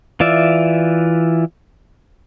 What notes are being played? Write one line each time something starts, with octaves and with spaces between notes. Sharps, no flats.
E3 F4 D5 E5